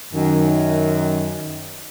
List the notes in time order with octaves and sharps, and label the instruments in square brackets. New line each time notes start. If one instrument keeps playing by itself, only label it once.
[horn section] F#2 D#3